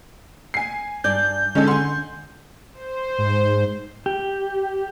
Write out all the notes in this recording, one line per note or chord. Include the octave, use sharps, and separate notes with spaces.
G#5 C7
G2 D5 G6
D3 G#3 C#4 D#4 A4
F#5 G#5 C6
C5
G#2
G4